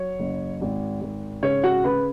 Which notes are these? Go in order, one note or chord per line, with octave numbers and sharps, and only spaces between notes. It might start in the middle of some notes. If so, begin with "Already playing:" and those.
Already playing: F#3 C#5
F#1
G#1
G#1
C#3 C#5
F#4 F#5
C#3 B4 B5